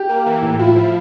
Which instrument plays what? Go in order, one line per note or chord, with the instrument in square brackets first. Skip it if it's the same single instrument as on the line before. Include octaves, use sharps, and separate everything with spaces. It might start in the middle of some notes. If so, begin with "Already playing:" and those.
Already playing: [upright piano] G4
[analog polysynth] A#3
E3
A2
[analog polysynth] E4 [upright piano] F4
[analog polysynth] F3